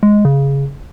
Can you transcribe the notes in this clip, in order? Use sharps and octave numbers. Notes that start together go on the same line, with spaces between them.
G#3
C#3